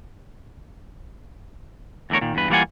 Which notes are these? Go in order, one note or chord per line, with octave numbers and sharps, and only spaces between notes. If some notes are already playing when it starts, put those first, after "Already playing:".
E2 D3 A3 A#4 C#5
A#2 D#3
E2 G2 B4
E3 G3 A#3 F4 F#5 G#5